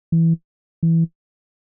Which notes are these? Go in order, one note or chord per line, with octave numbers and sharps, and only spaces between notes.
E3
E3